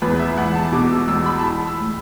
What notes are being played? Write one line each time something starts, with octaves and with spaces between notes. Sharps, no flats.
E2 B4
E5
E3 F#5
A5
B2 D6
E6
E2 E6
B5
A5
E3 B5
E6
A2